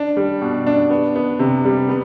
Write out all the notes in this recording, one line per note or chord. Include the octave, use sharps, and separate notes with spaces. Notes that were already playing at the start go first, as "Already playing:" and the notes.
Already playing: D4
G3
B2
D4
B3
B3
C3
G3
B3